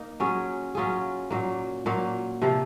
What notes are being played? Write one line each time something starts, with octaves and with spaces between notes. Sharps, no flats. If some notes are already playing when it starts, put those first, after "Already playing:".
Already playing: A#3 D#4
F#3 C#4 F4 G#4
F#3 C#4 F4 G#4
A#2 F#3 A#3
A#2 F#3 A#3
C3 F3 A#3